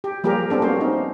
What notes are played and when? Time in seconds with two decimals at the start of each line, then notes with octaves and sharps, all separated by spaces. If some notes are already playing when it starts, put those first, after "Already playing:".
0.04 G4
0.24 F3 G3 A#3 G4 G#4 A#4
0.50 B3 C4 D4 A4
0.62 A#3 C4 C#4 F#4 C5
0.81 D#4